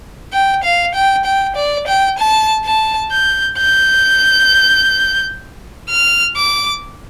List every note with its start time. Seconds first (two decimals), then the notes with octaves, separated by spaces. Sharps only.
0.33 G5
0.63 F5
0.94 G5
1.25 G5
1.56 D5
1.87 G5
2.18 A5
2.64 A5
3.12 G6
3.58 G6
5.89 F6
6.36 D6